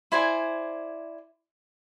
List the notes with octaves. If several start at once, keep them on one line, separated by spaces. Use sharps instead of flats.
E4 C5 D5 G#5